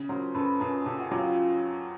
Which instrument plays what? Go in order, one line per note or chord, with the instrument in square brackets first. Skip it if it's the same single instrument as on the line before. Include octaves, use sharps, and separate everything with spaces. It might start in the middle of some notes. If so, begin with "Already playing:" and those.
Already playing: [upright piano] C#3
[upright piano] F#3 [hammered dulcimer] A#4 C5
[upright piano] F#2 [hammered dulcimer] A4 B4
[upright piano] F#2 [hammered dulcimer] G#4 A#4
[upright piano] C#3 [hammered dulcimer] G4 A4
[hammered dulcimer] F#4 G#4
[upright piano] F#3 [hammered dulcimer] F4 G4